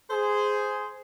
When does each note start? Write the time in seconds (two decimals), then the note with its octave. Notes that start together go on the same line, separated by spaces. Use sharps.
0.11 G#4 C5